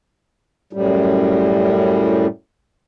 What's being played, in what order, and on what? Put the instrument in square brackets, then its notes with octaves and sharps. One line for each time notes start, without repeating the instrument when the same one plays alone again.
[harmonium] F#2 A2 G3